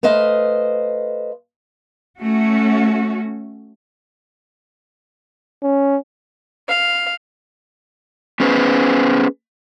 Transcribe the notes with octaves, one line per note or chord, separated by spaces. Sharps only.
A3 B4 C5 D#5 F5
A3 C#4 F#4
C#4
F5
B3 C#4 G#4 B4 C5